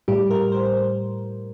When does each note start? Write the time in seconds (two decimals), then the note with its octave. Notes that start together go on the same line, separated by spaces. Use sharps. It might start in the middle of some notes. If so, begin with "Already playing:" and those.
0.08 A2 G3 G4
0.30 A#4
0.52 C5